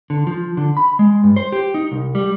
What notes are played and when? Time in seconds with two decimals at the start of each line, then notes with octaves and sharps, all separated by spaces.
0.10 D3
0.27 F3
0.57 D3
0.77 B5
0.99 G#3
1.24 G2
1.36 C5
1.52 G4
1.74 D#4
1.92 C2
2.15 G3